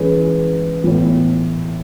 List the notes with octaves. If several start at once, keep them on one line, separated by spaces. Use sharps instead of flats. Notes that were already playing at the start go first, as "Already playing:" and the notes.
Already playing: E3 G#3 C#4 G#4 B4
A2 E3 B3